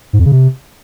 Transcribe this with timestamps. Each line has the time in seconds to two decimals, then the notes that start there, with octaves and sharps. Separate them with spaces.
0.13 G#2
0.19 F2
0.26 C#3
0.32 C3